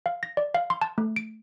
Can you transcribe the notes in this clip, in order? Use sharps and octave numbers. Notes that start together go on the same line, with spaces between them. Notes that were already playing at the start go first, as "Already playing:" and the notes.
F5
A#6
D5
F5
C6
A5
A3
D7